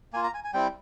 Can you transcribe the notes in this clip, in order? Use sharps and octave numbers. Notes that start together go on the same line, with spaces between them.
A#3 F4 G#5
A#5
G#5
G#5
G3 C4 E4 G5